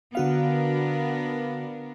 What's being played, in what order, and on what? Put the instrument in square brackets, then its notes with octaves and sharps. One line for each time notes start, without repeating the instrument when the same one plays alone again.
[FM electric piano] D3 F#4 F5 [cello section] B3 D4 A#4